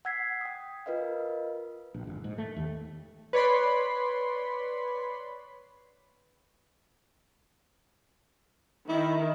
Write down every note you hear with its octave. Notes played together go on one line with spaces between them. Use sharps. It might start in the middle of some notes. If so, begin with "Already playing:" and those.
F#5 E6 G#6 B6 C7
G5 D#6
F4 A#4 B4 D#5 F5
A#1
G1
G#2
A3
D#2
B4 C#5 D5 B5 C6
D#3 E4